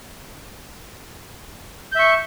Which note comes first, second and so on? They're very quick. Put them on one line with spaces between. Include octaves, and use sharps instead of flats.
G6 E5 C#6